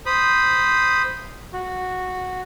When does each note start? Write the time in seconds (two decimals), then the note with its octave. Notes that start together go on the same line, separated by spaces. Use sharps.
0.06 C5 B5 D#6
1.53 F#4